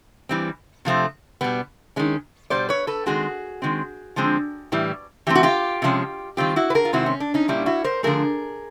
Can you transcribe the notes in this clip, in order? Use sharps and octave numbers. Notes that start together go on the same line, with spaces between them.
E3 G3 C4
C3 F3 A3 C4
B2 G3 B3
D#3 G#3 C#4
B2 G3 B3 C5 D5
B4 C#5
A4 B4
D#3 G#3 C4 F#4 G#4
D#3 G#3 C4
D3 F3 G#3 C4
A2 E3 G3
E3 A3 C4 G4
F#4
F4 G4
C3 F3 G#3 C#4
D#3 G3 C4 F4 G4
E4 F#4
B4
G#4 A#4
F4
C3 D#3 G#3 C4 E4 F#4
C#4
D4
C#4 D#4
A#2 G3 A#3 C#4 D4 E4
E4 F#4
A#4 C5
D3 F3 A3 G#4 A#4